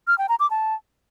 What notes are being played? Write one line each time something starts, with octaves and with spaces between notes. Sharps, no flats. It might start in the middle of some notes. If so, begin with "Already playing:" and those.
F6
G5
A#5
D6
A5